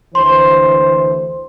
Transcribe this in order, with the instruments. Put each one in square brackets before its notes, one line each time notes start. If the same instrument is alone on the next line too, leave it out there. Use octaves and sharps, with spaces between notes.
[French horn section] D2 E3 C5 [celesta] C6